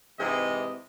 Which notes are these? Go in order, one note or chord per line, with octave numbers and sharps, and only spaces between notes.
G#2 C3 E3 G#3 G4 D#5